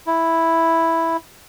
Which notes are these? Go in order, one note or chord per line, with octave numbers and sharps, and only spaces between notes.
E4